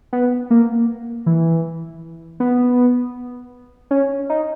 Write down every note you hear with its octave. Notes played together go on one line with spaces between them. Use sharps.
B3
A#3
E3
B3
C#4
D#4